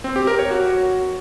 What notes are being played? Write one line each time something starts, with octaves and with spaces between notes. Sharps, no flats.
C4
G4
A#4
C#5
F#4